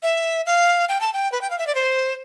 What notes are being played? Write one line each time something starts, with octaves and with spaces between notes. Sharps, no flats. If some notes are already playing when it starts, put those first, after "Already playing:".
E5
F5
G5
A5
G5
B4
G5
F5
E5
D5
C5